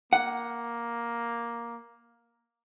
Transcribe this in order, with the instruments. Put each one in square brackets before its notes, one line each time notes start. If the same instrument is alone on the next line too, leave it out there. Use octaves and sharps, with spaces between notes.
[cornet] A#3 [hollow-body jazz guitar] F#5